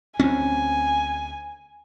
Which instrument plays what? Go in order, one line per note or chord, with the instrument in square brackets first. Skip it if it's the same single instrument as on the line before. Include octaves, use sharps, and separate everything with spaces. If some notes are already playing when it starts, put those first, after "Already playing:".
[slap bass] D2 C4 C#4 [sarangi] G#5